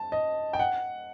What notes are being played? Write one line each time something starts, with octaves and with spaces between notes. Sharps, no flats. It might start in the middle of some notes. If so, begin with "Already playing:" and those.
Already playing: A5
D#5
G5
F#5